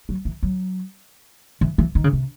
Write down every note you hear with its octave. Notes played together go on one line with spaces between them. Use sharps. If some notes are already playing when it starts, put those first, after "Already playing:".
F#3
E3
F#3
E3
E3
D#3
C#3
C3